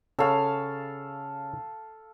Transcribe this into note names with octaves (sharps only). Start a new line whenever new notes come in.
C#3 A4 C#5 F5